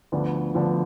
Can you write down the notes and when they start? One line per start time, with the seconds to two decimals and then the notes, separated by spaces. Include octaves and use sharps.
0.12 D2 D3 F3 B3 D4
0.54 D2 D3 F3 B3 D4